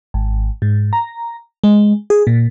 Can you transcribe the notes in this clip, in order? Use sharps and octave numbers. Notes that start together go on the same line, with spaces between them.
G#1
G#2
A#5
G#3
G#4
A#2